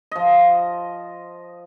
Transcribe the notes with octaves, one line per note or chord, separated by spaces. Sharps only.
F3 D#5